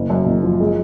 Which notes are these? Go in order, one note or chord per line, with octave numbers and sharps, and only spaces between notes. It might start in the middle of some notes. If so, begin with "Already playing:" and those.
Already playing: F#1
F#2
F#1
F3
G#3